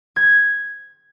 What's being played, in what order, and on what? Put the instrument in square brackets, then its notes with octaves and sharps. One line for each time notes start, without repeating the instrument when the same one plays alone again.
[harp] G#6